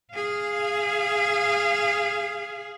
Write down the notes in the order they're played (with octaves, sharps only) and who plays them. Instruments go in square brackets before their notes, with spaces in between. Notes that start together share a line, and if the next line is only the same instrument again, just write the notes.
[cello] G#4 F5